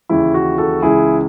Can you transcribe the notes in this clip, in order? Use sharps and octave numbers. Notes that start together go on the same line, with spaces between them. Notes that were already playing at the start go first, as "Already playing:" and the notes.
D#2 C#3 E3 E4
F#4
F#4 A4
C#2 C#3 E3 E4 G#4